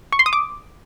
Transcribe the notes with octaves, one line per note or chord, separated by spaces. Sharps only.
C#6
C6
D#6
D6